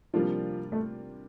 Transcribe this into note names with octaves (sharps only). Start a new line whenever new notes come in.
C3 F3 G3 A#3 D4 F4
A3